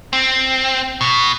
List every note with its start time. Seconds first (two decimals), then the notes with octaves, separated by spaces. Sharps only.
0.13 C4
1.01 B2